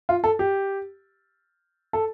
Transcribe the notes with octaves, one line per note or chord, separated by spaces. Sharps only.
F4
A4
G4
A4